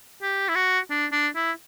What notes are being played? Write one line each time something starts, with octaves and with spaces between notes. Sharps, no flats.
G4
E4
F#4
D4
D4
E4